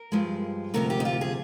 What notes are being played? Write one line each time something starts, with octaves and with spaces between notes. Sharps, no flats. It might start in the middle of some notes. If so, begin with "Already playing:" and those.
Already playing: A#4
G2 F3 G#3
D2 C3 F3 A#4
G4
D#4
F4
G#4